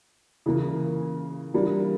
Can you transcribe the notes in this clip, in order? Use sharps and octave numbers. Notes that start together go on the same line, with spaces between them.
C#3 E3 A#3
E3 G3 A#3 D4